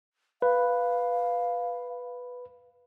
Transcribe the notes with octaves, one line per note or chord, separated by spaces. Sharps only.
B4 F5